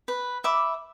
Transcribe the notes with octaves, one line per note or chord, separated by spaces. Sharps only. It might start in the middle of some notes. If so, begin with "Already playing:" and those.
B4
E5 B5 D6